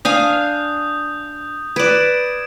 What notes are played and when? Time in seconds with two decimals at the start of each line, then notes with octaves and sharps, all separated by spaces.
0.05 D4 F5 G#5 D#6 G6
1.76 B4 D5 G#6 D7 E7